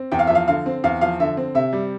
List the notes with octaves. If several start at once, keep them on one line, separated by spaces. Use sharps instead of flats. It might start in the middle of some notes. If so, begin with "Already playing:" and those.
Already playing: C4
E2 G5
F5
F3 E5
F5
D3 F5
C4
E2 F5
F3 F5
D3 E5
C4
C3 E5
G3